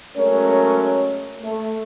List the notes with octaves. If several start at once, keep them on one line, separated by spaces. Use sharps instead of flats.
F#3 G#3 A3 C#4 A#4 C#5
A3